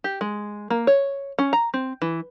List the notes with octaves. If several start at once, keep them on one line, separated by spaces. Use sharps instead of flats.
G4
G#3
A#3
C#5
C#4
A#5
C4
E3